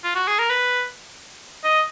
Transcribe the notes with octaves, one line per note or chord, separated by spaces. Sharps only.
F4
F#4
G#4
A#4
B4
D#5